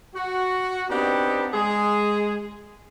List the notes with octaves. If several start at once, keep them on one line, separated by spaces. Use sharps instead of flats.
F#4
B3 C4 D4 D#4 G4
G#3 G#4